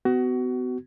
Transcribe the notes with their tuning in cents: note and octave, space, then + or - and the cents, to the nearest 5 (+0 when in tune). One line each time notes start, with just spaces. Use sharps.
B3 +35 F#4 +25